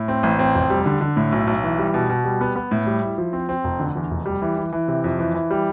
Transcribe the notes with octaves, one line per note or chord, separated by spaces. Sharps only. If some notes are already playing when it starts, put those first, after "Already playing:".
Already playing: A2
C4
A1
C4
F1
G3
D3
D3
A2
B1
B1
E3
G3
B2
B2
G3
B3
B3
A2
G3
E4
F3
C4
C4
F1
D3
E2
F1
G3
E3
E3
E3
C3
F2
E3
E3
G3